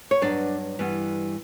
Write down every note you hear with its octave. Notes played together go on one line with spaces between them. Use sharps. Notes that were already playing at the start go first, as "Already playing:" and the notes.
C#5
G2 F#3 B3 D4 D5
G2 E3 G3 B3